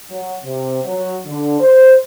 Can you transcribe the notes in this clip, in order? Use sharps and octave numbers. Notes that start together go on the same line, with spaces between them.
F#3
C3
F#3
D3
C5